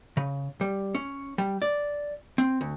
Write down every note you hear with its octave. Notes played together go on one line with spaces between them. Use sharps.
C#3
G3
C#4
G3
D5
C4
D2